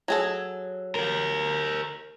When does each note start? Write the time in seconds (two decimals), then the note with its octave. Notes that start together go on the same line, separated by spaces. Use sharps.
0.08 F#3 G#4 A4
0.95 G4 A#4